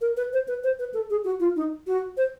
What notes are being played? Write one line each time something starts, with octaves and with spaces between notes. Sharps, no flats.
A#4
B4
C5
B4
C5
B4
A4
G#4
F#4
F4
D#4
F#4
C5